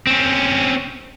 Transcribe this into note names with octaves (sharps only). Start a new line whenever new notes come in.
C4 C#4